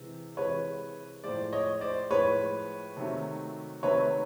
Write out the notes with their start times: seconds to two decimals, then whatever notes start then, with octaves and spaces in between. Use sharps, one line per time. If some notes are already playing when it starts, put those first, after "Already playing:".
Already playing: C3 E3 G#3
0.37 C3 E3 G#3 B4 C#5
1.24 A2 F3 G#3 C5 D5
1.52 C#5 D#5
1.81 C5 D5
2.10 A2 F3 G#3 B4 C#5
2.97 C3 D#3 F#3 A3
3.83 C3 D#3 F#3 A3 B4 C#5